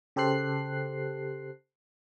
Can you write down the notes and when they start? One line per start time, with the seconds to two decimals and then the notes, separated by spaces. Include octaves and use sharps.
0.16 C#3 G4 A4 C5 F#6 C7